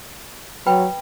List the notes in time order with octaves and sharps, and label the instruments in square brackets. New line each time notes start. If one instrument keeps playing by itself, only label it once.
[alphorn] F#3 [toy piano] B4 G5 B5